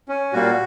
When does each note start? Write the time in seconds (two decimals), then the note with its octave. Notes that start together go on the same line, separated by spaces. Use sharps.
0.08 C#4
0.33 A#2 G3 A#3 F#4